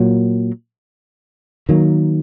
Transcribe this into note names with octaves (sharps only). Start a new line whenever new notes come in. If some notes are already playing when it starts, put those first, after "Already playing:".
Already playing: A#2 F#3 A#3
D#3 F#3 A#3